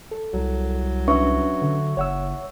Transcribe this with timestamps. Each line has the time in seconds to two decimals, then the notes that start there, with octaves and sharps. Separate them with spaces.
0.11 A4
0.33 C2 F#3
1.08 C#4 D4 B4 E5 C#6
1.62 D3
1.97 F#1 C#5 F#5 E6